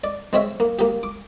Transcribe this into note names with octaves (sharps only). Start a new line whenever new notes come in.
D5
G#3 C4 C#5 E5
A#3
A#3 G4
D6